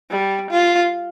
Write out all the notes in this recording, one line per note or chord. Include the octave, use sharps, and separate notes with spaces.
G3
F4